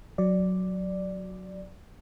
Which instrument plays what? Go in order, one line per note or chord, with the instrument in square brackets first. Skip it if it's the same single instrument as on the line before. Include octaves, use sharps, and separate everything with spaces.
[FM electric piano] F#3 D5